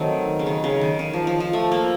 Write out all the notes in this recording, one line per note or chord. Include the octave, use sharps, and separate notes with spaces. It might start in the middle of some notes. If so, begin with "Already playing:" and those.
Already playing: D#3 F#3 A3 C4
C#3
D#3
C#3
D#3
D#3
F3
F3
F3
A3
A#3